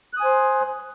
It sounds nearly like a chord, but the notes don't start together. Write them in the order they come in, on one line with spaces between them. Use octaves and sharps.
F#6 D#6 G#5 C5